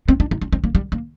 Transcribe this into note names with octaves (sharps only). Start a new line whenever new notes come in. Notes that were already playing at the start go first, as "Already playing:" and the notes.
C4
D4
D#4
D4
C4
A#3
G3
A#3